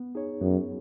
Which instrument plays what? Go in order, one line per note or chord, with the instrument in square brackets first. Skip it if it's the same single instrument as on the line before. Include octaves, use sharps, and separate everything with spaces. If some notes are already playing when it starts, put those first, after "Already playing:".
Already playing: [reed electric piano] B3
D#4 G#4 C#5
[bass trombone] F#2 [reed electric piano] B3